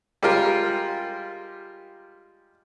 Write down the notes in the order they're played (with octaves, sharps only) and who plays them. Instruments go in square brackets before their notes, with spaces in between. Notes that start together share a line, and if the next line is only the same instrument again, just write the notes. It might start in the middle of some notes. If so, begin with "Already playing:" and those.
[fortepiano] G3 G#3 F4 A#4